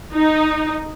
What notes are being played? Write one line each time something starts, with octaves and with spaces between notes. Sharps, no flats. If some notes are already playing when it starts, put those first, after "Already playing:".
D#4